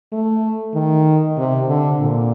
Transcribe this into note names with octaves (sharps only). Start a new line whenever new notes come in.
A3
D#3
C3
D3
A#2